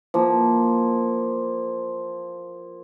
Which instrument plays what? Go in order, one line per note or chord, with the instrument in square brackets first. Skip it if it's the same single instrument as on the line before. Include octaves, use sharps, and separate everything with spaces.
[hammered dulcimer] F3 A#3